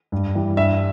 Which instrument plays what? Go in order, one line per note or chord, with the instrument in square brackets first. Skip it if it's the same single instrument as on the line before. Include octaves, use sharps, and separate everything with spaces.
[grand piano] G2
E3 G3
G2 E5